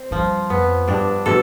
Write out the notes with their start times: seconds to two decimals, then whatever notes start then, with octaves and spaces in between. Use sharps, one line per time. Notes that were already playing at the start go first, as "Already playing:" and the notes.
Already playing: C4
0.11 G2 F3
0.50 F2 B3
0.88 G2 D4
1.26 B2 A4